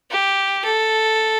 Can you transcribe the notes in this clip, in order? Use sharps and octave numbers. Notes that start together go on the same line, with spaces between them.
G4
A4